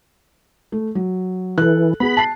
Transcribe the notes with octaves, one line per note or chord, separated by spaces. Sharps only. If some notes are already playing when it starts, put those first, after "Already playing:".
A3
F#3
E3 A4 F#6
B3 G#4 B5
A5 C7